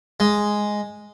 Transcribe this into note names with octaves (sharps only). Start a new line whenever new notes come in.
G#3